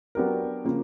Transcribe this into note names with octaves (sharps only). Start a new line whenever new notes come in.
F#3 B3 D4 G4 A#4
C#3 F3 A#3